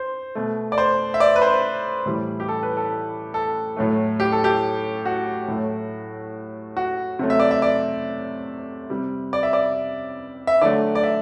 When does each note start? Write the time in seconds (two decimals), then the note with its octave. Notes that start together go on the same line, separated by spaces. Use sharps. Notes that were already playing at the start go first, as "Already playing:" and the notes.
Already playing: C5
0.35 B2 A3
0.72 D5
0.78 C5
1.14 E5
1.20 D5
1.36 B4
1.42 C5
2.06 A2 E3 G3
2.40 G4
2.48 A4
2.63 B4
2.77 A4
3.34 A4
3.77 A2 F#3 A3
4.20 G4
4.32 A4
4.44 G4
5.05 F#4
5.48 A2 F#3 A3
6.77 F#4
7.19 C3 F#3 A3
7.30 E5
7.40 D5
7.51 E5
7.62 D5
8.90 C3 G3
9.33 D5
9.43 E5
9.53 D5
10.47 E5
10.61 D3 F#3 A3 D5
10.95 D5
11.03 E5